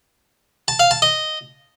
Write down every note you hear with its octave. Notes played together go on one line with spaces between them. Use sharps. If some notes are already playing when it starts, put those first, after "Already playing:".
A5
F5
A5
D#5